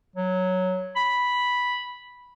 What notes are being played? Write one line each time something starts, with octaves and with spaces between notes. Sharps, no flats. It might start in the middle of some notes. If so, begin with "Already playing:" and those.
F#3
B5